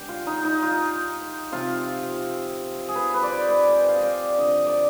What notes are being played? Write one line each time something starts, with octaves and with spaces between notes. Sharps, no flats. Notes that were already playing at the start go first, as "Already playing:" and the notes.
Already playing: D3 G#3 B3 G4
F4
D#4
D#4
F4
C3 F3 C4 F4
G#4
B4
B4
D5
C5
B4
C5
G5
F5
D#5
D5
D3 F3 C4 D#5
D5